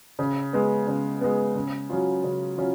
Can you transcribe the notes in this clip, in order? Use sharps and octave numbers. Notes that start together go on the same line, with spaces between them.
C#3
G#3 B3
C#3
G#3 B3
C#3
F#3 C#4 F4
C#3
F#3 C#4 F4